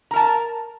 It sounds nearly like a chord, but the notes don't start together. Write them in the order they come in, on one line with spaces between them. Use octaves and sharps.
A#5 A#4 A5